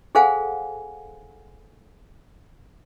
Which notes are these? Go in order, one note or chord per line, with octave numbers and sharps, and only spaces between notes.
G#4 A4 C5 F5 F#5 G#5